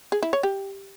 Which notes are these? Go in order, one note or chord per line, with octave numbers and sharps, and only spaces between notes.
G#4
E4
C#5
G4